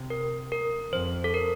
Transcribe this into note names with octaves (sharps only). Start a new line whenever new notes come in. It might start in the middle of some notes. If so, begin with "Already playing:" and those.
Already playing: C3
A#4
A#4
F2 C5
A4
A#4